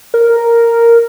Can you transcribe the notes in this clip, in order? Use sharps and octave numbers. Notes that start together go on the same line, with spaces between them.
A#4